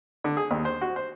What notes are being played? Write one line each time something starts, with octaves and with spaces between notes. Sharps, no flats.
D3
G#4
D#2
C5
F#4
C5